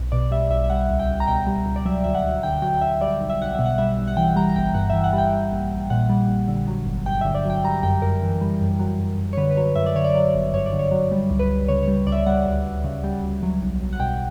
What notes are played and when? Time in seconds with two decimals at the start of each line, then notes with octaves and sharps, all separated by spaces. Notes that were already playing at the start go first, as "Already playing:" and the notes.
Already playing: B1
0.12 B2 D5
0.31 G3 E5
0.50 B1 E5
0.64 E5
0.70 G3 F#5
0.90 C#2
0.99 G5
1.09 C#2
1.20 A#5
1.27 B2 G5
1.47 G3
1.66 C#2
1.76 D5
1.85 F#3 E5
2.04 D2 E5
2.15 F#5
2.24 D2
2.43 D3 G5
2.62 F#3 G5
2.81 D2 E5
3.01 G3 D5
3.20 B1
3.30 E5
3.40 B1 F#5
3.55 B2 E5
3.66 F#5
3.78 G3 E5
3.97 B1
4.08 F#5
4.17 E3 G5
4.36 G3 A#5
4.49 A#5
4.56 G1 G5
4.74 G2 F#5
4.90 E3 E5
5.04 F#5
5.13 G3
5.18 G5
5.33 G3
5.52 A#1
5.71 A#1
5.90 A#2 F#5
6.10 G3
6.28 A#1
6.48 D3
6.68 F#3
6.86 G1
7.06 G2 G5
7.21 D3 E5
7.35 D5
7.45 F#3 G5
7.64 G3 A#5
7.83 F#2 G5
8.02 F#2 A#4
8.22 E3
8.41 G3
8.61 F#2
8.79 F#3
9.00 F#2
9.18 F#2
9.33 C#5
9.37 D3 B4
9.51 B4
9.57 F#3 C#5
9.76 F#2 E5
9.86 D5
9.96 D3 C#5
10.04 D5
10.15 F#3
10.35 G1
10.53 G2 C#5
10.66 D5
10.73 D3
10.79 C#5
10.91 F#3
11.12 G3
11.31 C#2
11.39 B4
11.50 C#2
11.68 C#3 C#5
11.83 G3 C#5
12.07 C#2 D5
12.12 E5
12.27 G3 F#5
12.46 D2
12.65 D2
12.84 C#3
13.04 G3
13.23 D2
13.43 F#3
13.62 B1
13.80 B1
13.93 F#5
14.00 B2 G5